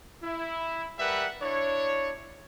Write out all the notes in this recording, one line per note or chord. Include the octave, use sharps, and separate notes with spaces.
E4
G3 A#4 B4 E5 F#5
D4 E4 C#5